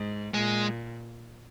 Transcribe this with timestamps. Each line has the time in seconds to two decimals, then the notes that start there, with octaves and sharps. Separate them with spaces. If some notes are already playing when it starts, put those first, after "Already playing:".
Already playing: G#2
0.34 A#2 G#3